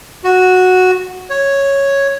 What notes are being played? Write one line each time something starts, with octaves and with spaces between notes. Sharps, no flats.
F#4
C#5